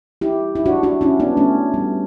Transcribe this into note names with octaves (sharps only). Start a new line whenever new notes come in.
E4 G4
E4
D4 F#4
D4 F#4
C#4 E4
B3 D4
A3 C#4
G3 B3